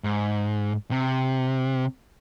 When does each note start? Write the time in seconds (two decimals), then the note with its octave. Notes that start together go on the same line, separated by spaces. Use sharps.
0.04 G#2
0.91 C3